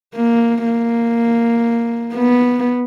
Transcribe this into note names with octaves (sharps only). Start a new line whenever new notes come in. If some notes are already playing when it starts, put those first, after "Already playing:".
A#3
A#3
B3